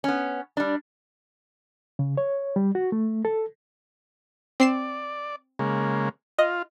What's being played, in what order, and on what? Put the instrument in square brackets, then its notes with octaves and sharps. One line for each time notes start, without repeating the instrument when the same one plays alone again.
[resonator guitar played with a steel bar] B3 C#4
G3 D4
[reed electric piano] C#3
C#5
G3
F#4
A3
A4
[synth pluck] C4 C7 E7 [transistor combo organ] D5
[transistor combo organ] C#3 G#3 A#3
[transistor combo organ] F4 [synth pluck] D#5